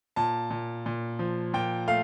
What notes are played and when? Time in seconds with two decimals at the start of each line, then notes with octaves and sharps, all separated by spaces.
0.16 A#2 A5
0.50 A#2
0.86 A#2
1.19 F3
1.54 A#2 G5
1.87 A3 F5